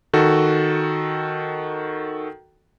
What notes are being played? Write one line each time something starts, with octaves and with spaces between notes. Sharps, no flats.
D#3 F#4 A4